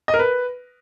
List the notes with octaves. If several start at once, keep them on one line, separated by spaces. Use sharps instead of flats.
D#5
A#4
B4